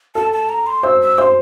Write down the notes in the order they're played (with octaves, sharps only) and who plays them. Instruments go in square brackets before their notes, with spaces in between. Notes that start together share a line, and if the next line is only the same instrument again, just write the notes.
[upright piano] A4 [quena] A5
[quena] A5
A#5
C6
[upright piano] C5 [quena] E6
[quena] E6
[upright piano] C5 [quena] C6